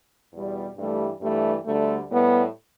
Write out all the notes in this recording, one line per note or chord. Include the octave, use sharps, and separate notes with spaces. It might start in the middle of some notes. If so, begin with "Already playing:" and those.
E2 B2 G3
G2 E3 G3 A3
G2 E3 G3 A3
D2 D3 G3 A3
A2 G3 B3